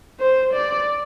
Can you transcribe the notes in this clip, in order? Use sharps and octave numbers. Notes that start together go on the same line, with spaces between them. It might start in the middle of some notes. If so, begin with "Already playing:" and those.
C5
D5